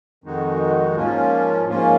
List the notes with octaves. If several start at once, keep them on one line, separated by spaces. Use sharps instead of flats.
F2 D#3 G#3 D#4 F#4
G#2 F3 A#3 C#4 F4
G#2 F3 A#3 C#4 F4